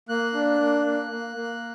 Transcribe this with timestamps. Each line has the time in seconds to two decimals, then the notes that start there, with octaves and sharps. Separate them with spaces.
0.09 A#3 F#6
0.34 D4
0.60 A#3
0.86 A#3
1.11 A#3
1.36 A#3